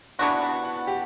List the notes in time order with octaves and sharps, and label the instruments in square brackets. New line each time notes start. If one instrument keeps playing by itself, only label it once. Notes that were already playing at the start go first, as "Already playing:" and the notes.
[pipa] E3 B3 D4 F#4 [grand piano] B5
[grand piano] B5
A5
F#5
G4